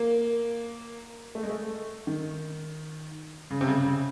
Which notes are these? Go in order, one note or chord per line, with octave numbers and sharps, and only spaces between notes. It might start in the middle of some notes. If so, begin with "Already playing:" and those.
Already playing: A#3
A3
G#3
A3
D#3
C#3
C3
C#3
C#3